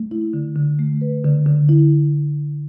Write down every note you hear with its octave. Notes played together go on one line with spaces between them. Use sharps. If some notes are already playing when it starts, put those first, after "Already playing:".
Already playing: A3
E4
D3
D3
A3
B4
D3
D3
E4